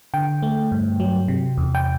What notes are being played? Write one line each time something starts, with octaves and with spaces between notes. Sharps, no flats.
D3 G5
A3
G2
F#3
C3
E2
G5